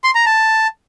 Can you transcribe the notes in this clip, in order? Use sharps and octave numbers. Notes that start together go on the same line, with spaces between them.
C6
A#5
A5